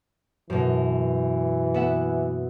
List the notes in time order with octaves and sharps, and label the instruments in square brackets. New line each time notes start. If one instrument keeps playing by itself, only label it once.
[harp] F#2 B2 [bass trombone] E3
[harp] B3 E5 F#5